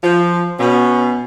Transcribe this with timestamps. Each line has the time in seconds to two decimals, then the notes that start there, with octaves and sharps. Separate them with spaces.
0.03 F3
0.59 B2 C#4